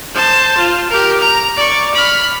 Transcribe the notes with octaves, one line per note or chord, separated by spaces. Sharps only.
C5 A5
F4
G4 A#4
A#5
D5 C#6
B5 F6